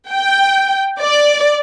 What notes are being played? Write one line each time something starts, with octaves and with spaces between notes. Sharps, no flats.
G5
D5